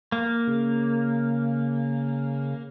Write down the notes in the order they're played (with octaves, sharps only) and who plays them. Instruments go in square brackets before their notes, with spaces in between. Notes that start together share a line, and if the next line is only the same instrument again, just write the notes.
[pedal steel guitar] A#3
[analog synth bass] C#3